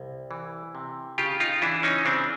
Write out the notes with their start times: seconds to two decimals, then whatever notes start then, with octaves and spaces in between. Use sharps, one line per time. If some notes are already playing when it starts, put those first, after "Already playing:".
Already playing: C2
0.31 E3
0.75 C3
1.18 C#3 F4 G4
1.40 D#4 F4
1.62 E3 D4 E4
1.83 C#4 D#4
2.05 C#3 C4 D4